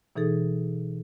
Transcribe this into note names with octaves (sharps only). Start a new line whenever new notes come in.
B2 E3 D#4 G#4 A4